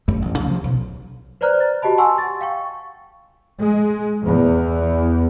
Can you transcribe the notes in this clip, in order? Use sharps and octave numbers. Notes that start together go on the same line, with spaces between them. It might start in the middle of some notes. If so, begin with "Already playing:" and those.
G1 F#2 G3 A3
A1
C#2 C#3 F3 A3
C3 F3
B1
B4 C5 D5 A#5 F6 F#6
A6
F#4 G4 D#5 A5 B5
F#5 G#5 A5 C6 C#6 E6
A6
F5 G5 C#6
G#3
E2